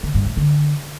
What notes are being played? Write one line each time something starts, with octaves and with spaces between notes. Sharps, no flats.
D3
G2
A2
D3